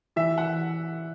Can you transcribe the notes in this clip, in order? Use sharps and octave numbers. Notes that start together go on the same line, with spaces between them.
E3 E5
F#5